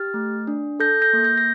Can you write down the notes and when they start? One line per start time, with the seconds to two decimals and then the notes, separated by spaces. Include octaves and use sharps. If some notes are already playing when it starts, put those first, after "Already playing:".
Already playing: G4 F6 A6
0.14 A3
0.47 D4
0.80 A4 G6 A#6
1.02 G6 A#6
1.13 A#3
1.24 G6 A#6
1.37 A#6